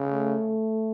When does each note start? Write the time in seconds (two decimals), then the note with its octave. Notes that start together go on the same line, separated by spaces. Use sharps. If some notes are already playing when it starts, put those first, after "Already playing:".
Already playing: C#3
0.08 A3